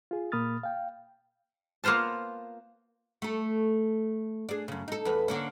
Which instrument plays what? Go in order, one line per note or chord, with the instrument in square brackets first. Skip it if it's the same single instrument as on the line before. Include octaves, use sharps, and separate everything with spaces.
[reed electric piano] F4 G#4
A#2 A#3 B5 D#6 F6 A6
F5 G5
[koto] A#3 B3 F4 C5 A5
[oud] A3 A4
D4 G#4
F#2 C#3
D#4 A4
E2 B4
D3 A#3 C#4